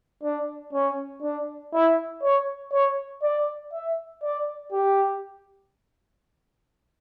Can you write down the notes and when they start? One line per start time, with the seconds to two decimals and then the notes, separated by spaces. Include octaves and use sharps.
0.23 D4
0.73 C#4
1.22 D4
1.73 E4
2.23 C#5
2.72 C#5
3.22 D5
3.73 E5
4.23 D5
4.72 G4